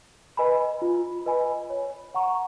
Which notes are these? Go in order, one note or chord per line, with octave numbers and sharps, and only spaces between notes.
B4 D#5 G#5 B5
F4
B4 D#5 G#5 B5
C#5
F#5 A#5 C#6